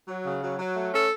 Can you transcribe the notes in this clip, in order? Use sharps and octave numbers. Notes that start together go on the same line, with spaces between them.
F#3
C#3
F#3
F#3
A3
C#4 A4